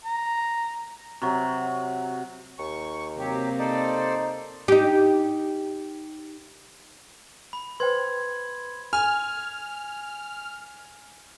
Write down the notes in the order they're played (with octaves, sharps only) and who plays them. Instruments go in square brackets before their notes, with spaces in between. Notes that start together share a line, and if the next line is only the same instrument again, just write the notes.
[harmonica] A#5
[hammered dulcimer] C3 F#3
[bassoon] D#2 [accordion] C#6
[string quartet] C3 A#3 [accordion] F#3 G4
[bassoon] D#4 [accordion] A4 C5 D5
[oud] D#4 G4
[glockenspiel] B5
[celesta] B4 C5 G5 [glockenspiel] C6 G#6
[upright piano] G#5 [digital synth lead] F6